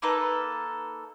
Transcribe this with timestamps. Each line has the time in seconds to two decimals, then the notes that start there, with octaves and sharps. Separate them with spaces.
0.02 A#3 D#4 A4 B4